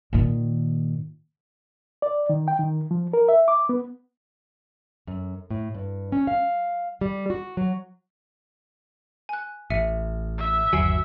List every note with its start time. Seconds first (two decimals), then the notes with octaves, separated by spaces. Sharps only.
0.13 A#2 D#3
2.02 D5
2.29 D#3
2.48 G5
2.59 D#3
2.91 F3
3.13 A#4
3.29 E5
3.48 D6
3.69 B3
5.07 F#2
5.50 A2
5.75 G2
6.12 C#4
6.27 F5
7.01 G3
7.30 F#4
7.57 F#3
9.29 G#5 F#6
9.70 A1 E5 C#7 D#7
10.39 E5
10.73 G1 D#2 F#3 G#5 C7 D7